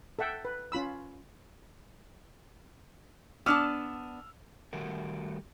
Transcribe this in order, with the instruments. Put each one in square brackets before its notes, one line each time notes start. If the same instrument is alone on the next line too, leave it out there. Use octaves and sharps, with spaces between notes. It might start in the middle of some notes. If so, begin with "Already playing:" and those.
[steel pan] A4 E5 F#5 G5
B4
C#4 F4 B5 E6
[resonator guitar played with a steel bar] B3 D4 A5 [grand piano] E6 F6
[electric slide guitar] D#3 G3 A3 F#4 A#4